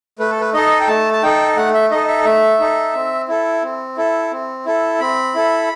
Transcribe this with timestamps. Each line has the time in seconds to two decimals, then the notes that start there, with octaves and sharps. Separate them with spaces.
0.19 A3 B4
0.30 A4
0.41 B4
0.54 D#4 A4 D#5
0.80 G5
0.88 A3 A5
1.13 A5
1.23 D#4 A4 G5
1.57 A3 F#5
1.74 E5
1.91 D#4 A4 D#5
2.08 E5
2.25 A3 E5
2.60 D#4 A4
2.94 C4
3.28 E4 A4
3.63 C4
3.97 E4 A4
4.31 C4
4.66 E4 A4
5.00 C4 B5
5.35 E4 A4